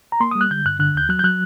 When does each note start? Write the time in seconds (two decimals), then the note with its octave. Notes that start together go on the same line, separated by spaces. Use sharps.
0.12 A#5
0.20 A#3 C6
0.31 G3 D#6
0.41 F#6
0.51 D3 G6
0.65 G2 F#6
0.80 D3 F#6
0.95 D#2 G6
1.09 F#3 F#6
1.19 G6
1.24 F#3 F#6